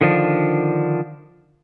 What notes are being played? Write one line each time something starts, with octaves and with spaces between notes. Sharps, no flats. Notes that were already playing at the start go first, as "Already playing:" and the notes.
D3 D#3 F3 D4